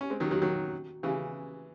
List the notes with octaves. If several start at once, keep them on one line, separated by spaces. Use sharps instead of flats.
C#4
G#3 C4
D#3 F#3
D#3 F#3
D#3 F#3
C#3 E3